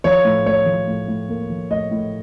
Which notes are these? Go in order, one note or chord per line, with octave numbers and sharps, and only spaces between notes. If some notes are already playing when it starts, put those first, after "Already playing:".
F3 C#5
A2
A2 C#5
F3
A2
A2
A#3
F3
A2 D#5
A2